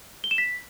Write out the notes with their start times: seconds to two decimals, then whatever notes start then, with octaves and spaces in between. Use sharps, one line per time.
0.24 G7
0.31 E7
0.38 B6